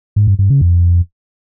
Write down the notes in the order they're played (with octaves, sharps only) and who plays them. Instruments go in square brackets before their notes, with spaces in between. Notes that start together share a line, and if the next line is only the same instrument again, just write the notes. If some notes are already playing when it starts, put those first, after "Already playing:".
[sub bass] G#2
G2
G2
C#3
F2